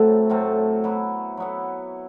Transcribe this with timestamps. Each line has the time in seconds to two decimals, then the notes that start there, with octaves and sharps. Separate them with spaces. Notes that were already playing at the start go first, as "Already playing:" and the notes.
Already playing: A2 F#3 A3 C4
0.30 A2 F#3 A3 C4
0.84 F#3 B3 E4
1.37 F#3 B3 E4